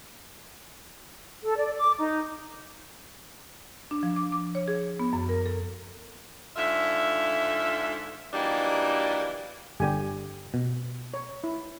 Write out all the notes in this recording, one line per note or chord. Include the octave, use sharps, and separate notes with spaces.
A4
D5
D6
D#4
D4
F3
D6
D6
C#5
G#4
B3
F#2
A#4
A4
G#2 D3 F4 E5
E3 F#3 G3 A#3 D4 D#4
G1 D3 G4 G5 G#5
B2
C#5
E4